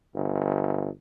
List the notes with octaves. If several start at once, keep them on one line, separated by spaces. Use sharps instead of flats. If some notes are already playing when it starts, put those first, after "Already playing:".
G1